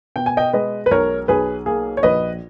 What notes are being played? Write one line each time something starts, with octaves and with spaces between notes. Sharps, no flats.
B2 G5
G#5
D#5 G5
G#3 B4 D#5
B4
B1 A#4 C#5
B1 G#4 B4
A#3 G#4
C#5
A#1 B4 D#5